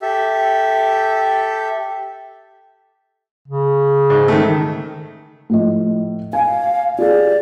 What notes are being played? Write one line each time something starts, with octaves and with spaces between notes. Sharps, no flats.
G4 A4 E5
C#3
G#2
D#3 A3
A2 F3 D#5
F5 G#5
F4 G4 G#4 D5